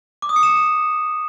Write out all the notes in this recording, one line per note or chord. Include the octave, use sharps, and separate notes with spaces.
D6
D#6
C#7
E7